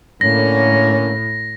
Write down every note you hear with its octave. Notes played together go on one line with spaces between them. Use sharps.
A2 D3 A#3 C#4 A#6